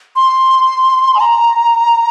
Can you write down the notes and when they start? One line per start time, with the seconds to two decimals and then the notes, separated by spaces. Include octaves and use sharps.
0.16 C6
1.15 G#5
1.20 A#5